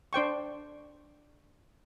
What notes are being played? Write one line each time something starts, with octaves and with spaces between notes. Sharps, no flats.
D4 C5 G5 C#6